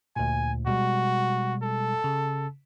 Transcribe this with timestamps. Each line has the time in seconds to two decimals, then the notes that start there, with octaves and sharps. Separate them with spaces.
0.16 D2 A#2 G#5
0.67 B2 G3 G#3 F#4
1.63 A4
2.04 C#3